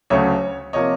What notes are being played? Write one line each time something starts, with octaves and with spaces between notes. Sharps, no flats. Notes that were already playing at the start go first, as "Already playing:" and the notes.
D2 C#3 F#3 A3 C#5
C3 F3 A#3 C#5 D#5